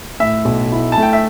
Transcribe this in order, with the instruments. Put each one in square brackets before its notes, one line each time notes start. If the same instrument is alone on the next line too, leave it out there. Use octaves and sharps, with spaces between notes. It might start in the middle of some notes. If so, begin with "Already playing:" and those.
[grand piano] A2 [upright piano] E5
[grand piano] B1
E4
[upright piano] A5
[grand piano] A3 [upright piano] G5
[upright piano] E5